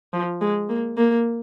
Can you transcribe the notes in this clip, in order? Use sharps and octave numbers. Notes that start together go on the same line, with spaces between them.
F3
G#3
A#3
A#3